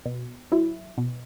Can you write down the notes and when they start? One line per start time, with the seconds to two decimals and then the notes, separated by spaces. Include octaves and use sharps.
0.06 B2
0.52 F#3 E4
0.98 B2